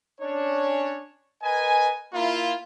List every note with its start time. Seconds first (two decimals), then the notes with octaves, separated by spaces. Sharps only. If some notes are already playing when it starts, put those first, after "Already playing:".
0.21 C#4 D4 C#5
1.43 A#4 B4 D#5 G#5
2.14 A#3 E4 F4